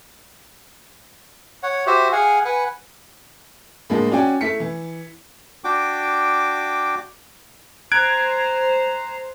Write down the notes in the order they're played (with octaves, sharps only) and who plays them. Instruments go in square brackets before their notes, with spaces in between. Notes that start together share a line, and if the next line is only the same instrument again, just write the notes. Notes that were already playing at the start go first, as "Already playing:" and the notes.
[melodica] C#5 F#5
F#4 G4 C5 E5
G#4 F5 F#5 G#5
B4 F#5 G#5
[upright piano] A2 D3 F3 G#3 A#3
C#4 F#4 D5 G5 G#5
A3 E4 B6 C#7
E3
[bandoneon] D4 F#4 G5 D6
[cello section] C5 [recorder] A#5 [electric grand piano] F#6 G#6 D7